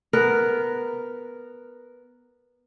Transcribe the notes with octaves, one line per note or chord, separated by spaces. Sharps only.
B3 A#4